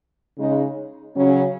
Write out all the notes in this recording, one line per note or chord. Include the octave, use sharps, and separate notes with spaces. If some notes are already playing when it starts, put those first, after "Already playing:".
C#3 G#3 D#4
C#3 F#3 C#4